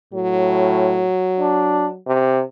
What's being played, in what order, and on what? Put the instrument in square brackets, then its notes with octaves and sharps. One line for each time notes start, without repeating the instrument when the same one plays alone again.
[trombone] A2 [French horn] F#3
[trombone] D4
C3